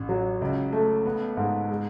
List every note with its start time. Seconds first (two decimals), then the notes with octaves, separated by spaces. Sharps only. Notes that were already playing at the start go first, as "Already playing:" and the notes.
Already playing: A1
0.09 F#3
0.41 C#2
0.73 A3
1.06 B3
1.37 G#2
1.69 G#3